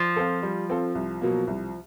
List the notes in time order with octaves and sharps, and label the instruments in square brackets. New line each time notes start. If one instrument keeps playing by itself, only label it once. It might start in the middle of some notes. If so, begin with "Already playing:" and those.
Already playing: [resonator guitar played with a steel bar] F3
[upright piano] C4 F4 A4
G3
C4 F4 A4
C2
B2 F#3 A#3
C2